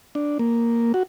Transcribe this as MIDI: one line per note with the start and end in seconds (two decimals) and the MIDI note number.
0.15 0.38 62
0.39 0.92 58
0.94 1.03 66